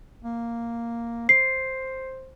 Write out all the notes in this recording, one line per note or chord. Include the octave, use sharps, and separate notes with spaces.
A#3
C5 C7